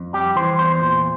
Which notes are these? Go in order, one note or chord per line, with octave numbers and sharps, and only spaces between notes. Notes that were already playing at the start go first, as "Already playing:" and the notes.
Already playing: F2
G3 G4
E3 C5
E2 C5
A#2